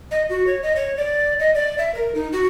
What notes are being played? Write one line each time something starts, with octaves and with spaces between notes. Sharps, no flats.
D#5
F#4
C#5
D#5
C#5
D5
D#5
D5
E5
A#4
D#4
F#4